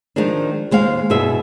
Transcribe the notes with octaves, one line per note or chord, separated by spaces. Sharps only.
D#3 F3 G#3 D4
D#2 G#3 C5 F5
G2 B2 E4 G#4 E5